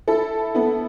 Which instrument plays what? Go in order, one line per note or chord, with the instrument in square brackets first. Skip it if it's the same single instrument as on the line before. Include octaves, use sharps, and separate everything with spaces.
[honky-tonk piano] E4 A4
B3 E4